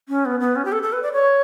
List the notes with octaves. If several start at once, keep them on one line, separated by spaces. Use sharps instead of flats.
C#4
B3
B3
C#4
G4
A4
A4
B4
D5
C#5